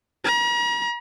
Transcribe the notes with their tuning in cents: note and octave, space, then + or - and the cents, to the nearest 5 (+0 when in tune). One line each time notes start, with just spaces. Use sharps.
A#5 +45